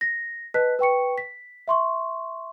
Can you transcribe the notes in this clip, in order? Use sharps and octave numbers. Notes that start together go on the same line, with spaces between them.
A#6
B4 D#5 A5 F#6 B6
B4 G5 C#6 C#7
B6
E5 C6 C#6